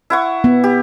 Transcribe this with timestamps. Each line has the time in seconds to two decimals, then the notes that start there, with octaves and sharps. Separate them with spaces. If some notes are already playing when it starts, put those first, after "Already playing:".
0.10 E4 F#5 C#6
0.44 B3
0.64 G4